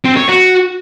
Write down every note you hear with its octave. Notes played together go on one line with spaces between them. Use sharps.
C4
C#5
F#4